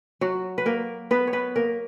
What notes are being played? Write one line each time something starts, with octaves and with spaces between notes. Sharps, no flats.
F#3 F#4
B4
A#3 A#4
B3 B4
C#5
B3 B4
A#3 A#4